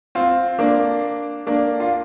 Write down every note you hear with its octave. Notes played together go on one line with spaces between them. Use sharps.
C4 F4
A#3 D4
A#3 D4
F4